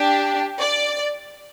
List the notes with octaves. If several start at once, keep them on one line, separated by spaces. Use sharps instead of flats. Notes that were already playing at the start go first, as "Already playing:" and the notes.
Already playing: D4 G4
D5